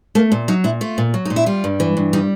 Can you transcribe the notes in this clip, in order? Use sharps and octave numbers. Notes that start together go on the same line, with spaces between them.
A3 A#3
A#2
F#3 D#4
A#2 E4
A3 F4
A#2
F#3
A#2 D#4
E4
G3 F4
G2
E3
G2
G3 D#4